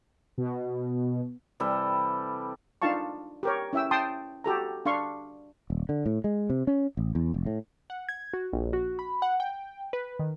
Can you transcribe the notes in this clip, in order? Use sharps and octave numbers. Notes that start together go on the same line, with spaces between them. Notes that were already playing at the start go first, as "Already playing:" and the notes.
B2
C3 E3 G3 A4
D4 D#4 F4 F5 A5 C#6
G4 A#4 C#5
C#4 E4 E5 G5 E6
G5 A5 C6 D#6
F#4 G4 A4 A#5
D4 F5 C6 C#6
D#1
D3
A2
G#3
C3
C#4
A1
E2
F1
A2
F#5
G#6
F#4
A#1
F#4
B5
F#5
G5
B4
D#3